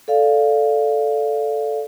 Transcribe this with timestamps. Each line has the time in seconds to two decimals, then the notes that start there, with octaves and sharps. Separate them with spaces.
0.08 A4 D5 F5